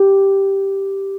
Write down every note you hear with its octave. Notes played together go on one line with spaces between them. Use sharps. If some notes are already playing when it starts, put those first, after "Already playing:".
Already playing: G4